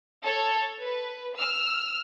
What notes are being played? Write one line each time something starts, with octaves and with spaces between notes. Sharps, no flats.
A4 C#5
B4
E6 F6